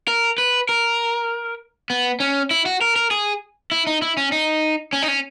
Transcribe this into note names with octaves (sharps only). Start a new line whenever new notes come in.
A#4
B4
A#4
B3
C#4
E4
F#4
A#4
A#4
G#4
E4
D#4
E4
C#4
D#4
C#4
D#4
C#4